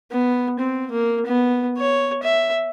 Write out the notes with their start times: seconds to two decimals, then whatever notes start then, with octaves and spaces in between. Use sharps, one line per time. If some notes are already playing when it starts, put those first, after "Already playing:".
0.11 B3
0.59 C4
0.91 A#3
1.26 B3
1.77 C#5
2.23 E5